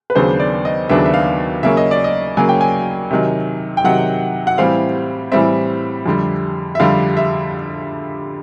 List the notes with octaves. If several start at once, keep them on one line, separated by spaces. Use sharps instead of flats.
B4
D#2 C#3 F#3 B3 D4 C5
D5
D#5
D#2 C#3 F#3 B3 D4 E5
E5
F5
C#3 F#3 A#3 C#4 E5
D#5
D5
D#5
C#3 F#3 A#3 C#4 G#5
G5
G#5
C3 D#3 F#3
G5
C3 D#3 F#3 F#5
F#5
A2 E3 G3 C4 F5
A2 E3 G3 C4 E5
F2 D3 G3
E5
F2 D3 G3 F5
E5